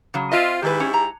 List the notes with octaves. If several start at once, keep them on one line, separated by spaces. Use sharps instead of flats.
C#3 F#3
C4 F4 D#5 E5
G#2 D#3 E4 G4 B4
C#4
A#5